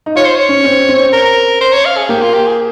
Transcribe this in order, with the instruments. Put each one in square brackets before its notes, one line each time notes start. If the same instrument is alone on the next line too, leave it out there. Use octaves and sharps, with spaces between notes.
[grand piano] D#4
[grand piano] F4 [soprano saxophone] C#5
[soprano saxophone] C5
C#5
[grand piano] C#4
C4
C4
[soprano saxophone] A#4
C5
C#5
F5
G#4
[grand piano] A#3 [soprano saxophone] G4
[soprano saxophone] F4
G4
G#4